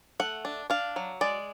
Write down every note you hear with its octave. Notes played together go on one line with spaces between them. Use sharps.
A3 F#5
D4
D4 F5
F#3
G#3 D5